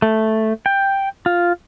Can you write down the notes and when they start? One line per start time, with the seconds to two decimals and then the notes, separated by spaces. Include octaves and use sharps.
0.02 A3
0.66 G5
1.26 F4